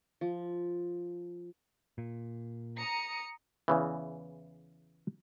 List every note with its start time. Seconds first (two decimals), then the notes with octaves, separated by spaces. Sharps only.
0.21 F3
1.98 A#2
2.77 A#5 D#6 C#7
3.68 E2 C#3 E3